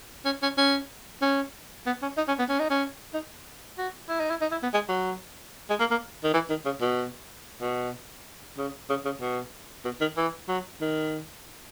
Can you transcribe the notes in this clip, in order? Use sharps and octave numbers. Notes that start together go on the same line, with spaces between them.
C#4
C#4
C#4
C#4
B3
C#4
D#4
C#4
B3
C#4
D#4
C#4
D#4
F#4
E4
D#4
E4
D#4
E4
B3
G#3
F#3
G#3
A#3
A#3
D#3
E3
D#3
C#3
B2
B2
C#3
C#3
C#3
B2
B2
D#3
E3
F#3
D#3